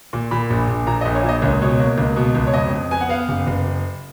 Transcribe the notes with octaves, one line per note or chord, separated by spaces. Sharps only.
A#2
A#2 B5
A#1
A#1
A#2 A#5
D#5
A#1
C#5
A#2
D#5
C#2 C#5
B2 C#5
A#3
C#2
B2
C#2
C#5
F2 D#5
F2
B3 G#5
F#5
B3 F5
F#1
F#1